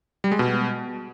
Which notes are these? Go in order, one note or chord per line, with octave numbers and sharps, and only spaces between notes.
G3
G#3
B2